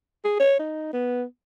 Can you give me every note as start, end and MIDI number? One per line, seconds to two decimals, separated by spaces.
0.24 0.38 68
0.40 0.59 73
0.59 0.89 63
0.93 1.24 59